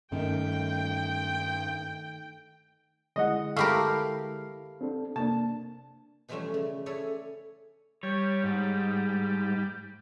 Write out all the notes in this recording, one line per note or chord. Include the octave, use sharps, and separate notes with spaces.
G2 D#3 A3 C#4 G5
D3 G#3 E4 D#5 F#5
A3 G4 A#4 F5 B5
C4 D4 A4
C3 A#3 D4 A5
B2 E3 F3 G3 A3 C#4
C#3
C#4 E4 G#4 A4 C#5 D5
G3 C#5
G#2